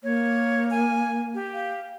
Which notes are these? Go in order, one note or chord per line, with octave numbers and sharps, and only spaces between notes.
A#3 C#5
G#5
G4
F5